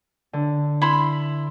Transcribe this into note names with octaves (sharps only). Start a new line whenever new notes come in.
D3
E4 B5 C6